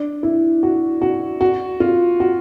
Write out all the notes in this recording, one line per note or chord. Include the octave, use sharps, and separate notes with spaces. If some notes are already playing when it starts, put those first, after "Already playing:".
Already playing: D4
E4
F#4
F#4
F#4
F4
F#4